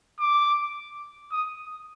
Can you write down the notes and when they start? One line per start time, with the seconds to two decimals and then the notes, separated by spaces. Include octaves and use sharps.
0.19 D6
1.31 D#6